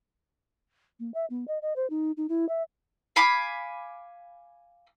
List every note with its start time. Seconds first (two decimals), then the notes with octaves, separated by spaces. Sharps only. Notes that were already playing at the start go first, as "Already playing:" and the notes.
1.00 A#3
1.14 E5
1.30 B3
1.48 D#5
1.62 D#5
1.76 C5
1.90 D#4
2.17 D#4
2.29 E4
2.49 E5
3.16 F5 G#5 B5 D6